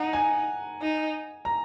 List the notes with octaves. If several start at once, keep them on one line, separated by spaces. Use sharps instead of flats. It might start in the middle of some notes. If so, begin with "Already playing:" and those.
Already playing: D#4 F#5 A#5
G#5
D#4
A#5